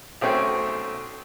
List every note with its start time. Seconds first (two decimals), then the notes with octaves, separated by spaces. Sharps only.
0.21 B1 A3 C4 C#4 G5